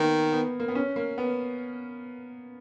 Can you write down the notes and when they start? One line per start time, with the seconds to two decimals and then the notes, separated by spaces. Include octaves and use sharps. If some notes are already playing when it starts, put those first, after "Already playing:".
Already playing: D#3 A#3 B3
0.32 B3
0.60 A#3
0.68 B3
0.75 C#4
0.96 A#3
1.18 B3